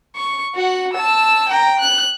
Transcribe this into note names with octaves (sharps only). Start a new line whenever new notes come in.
C#6
F#4 F#5
A5 E6
G5 A#5
F#6